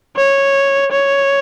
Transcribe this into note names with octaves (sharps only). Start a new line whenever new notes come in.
C#5
C#5